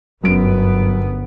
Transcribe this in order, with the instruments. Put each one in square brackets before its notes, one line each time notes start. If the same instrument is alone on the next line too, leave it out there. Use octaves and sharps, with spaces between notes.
[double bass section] G1 B3 [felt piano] F#2 D7